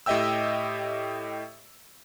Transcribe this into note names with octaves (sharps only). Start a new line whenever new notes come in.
A2 G4 D#5 E5 G5 E6